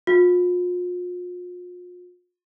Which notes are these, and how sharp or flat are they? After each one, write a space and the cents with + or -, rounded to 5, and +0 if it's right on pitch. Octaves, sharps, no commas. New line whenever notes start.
F4 +40